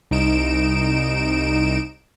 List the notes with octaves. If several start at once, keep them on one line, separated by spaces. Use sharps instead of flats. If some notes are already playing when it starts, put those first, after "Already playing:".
C2 D#4 D7 E7